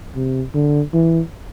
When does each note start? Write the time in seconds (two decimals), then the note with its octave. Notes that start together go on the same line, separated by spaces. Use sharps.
0.15 C3
0.54 D3
0.93 E3